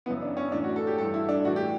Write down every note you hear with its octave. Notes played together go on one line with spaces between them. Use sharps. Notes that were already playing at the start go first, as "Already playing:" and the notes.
F#2 C#3 E3 B3
D4
C#4
A2 E3 D4
F#4
A4
G4
G2 E3 A4
E4
D4
A2 E3 F#4
G4